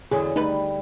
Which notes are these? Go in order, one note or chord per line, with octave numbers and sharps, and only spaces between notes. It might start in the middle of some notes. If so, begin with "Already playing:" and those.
E2 D3 F#3 G#4
D2 G3 D#4 B4